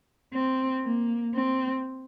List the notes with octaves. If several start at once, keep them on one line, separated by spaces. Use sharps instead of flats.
C4
A#3
C4